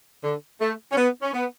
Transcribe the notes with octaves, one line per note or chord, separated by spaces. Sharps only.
D3
A3
C#4
B3
C#4
B3